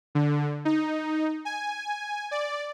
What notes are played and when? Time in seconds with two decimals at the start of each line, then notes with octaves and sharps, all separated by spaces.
0.15 D3
0.65 D#4
1.45 G#5
2.31 D5